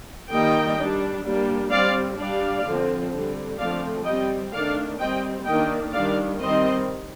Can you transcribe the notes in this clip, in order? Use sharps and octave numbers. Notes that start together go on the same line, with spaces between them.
D#3 G3 A#3 D#5 G5
G3 D4
G3 A#3 D4
G3 C4 D5 F5
G3 D4 D5 F5
D3 F3 C4
D3 G3 C4
D3 F3 A3 C4 D5 F5
G3 C4 D#5 G5
D#3 A3 D4 D5 F5
G3 C4 D#5 G5
D#3 A#3 D4 D#5 G5
D#3 G3 D4 D5 F5
D#3 G3 C4 C5 D#5